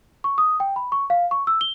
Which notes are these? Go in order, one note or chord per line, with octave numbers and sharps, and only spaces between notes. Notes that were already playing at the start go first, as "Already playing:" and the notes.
C#6
D#6
G5
B5
C#6
F5
C#6
E6
G7